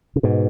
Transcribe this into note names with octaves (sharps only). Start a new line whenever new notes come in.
C#3
G#2 B2